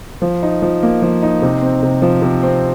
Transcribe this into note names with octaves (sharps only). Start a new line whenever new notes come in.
F3
D#4
F3
A#3
F3
D#4
C3
C4
C3
F3
C3
C4